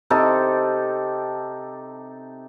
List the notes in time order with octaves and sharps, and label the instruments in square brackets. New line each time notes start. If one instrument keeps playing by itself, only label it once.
[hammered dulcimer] C3 D#4 G4 A4